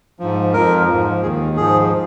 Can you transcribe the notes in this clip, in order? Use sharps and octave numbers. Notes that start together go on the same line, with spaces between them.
G#2 F3
F2 F3 A#4
G#2 F3
D#2 D#3 G#4
G#2 F3 G#4